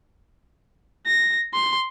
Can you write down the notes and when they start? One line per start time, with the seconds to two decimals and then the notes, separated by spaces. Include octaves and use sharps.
1.07 A#6
1.54 C6